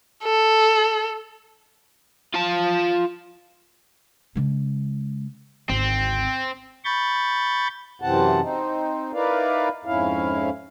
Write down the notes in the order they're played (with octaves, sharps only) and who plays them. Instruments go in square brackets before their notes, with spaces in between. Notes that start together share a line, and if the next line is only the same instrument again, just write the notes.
[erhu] A4
[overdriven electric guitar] F4 A5
[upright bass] C#3 G#3
[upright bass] G#1 D2 [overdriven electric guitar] C4
[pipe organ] B5 C#6 G6 A6
[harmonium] F#2 C3 E3 C4 F#5 A5
C4 D#4
D#4 E4 A#4 B4 D5 F5
F2 G#2 C#4 E4 F5